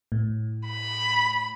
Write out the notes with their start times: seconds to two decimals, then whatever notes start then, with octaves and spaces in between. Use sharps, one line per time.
0.12 A2
0.67 B5